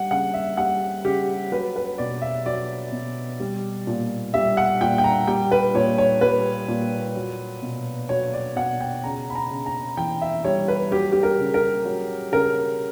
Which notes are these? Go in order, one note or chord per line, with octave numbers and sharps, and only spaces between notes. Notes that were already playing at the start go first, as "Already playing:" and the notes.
Already playing: G3 F#5
C#3 F#5
E5
G3 F#5
C#3 G4
F#3 B4
B4
B2 D5
E5
F#3 D5
B2
G3
A#2
G3 E5
F#5
A#2 G5
G5
A#5
G3 G5
B4
A#2 C#5
C#5
G3 B4
A#2
F#3
B2
F#3 C#5
D5
B2 F#5
G5
C#3 A#5
B5
A#5
C#3
A#5
E3 G5
E5
G3 C#5
B4
F#3 G4
G4
A#4
C#3
A#4
F#3
C#3 A#4